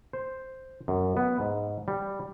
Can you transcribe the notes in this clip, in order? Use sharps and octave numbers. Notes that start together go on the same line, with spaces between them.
C5
F#2
B3
G#2
G3